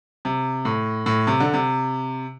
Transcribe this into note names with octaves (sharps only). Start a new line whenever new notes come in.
C3
A2
A2
C3
D3
C3